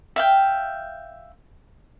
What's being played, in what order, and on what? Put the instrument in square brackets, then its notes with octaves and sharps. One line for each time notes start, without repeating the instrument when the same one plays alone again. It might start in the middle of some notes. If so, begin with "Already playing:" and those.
[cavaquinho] E5 F5 G5